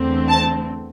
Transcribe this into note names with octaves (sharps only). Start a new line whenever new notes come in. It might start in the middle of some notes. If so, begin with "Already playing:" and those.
Already playing: E2 D3 A3 C4
A5